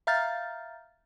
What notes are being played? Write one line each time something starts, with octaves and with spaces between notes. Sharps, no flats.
E5 F5 A#5 F6 G6 A6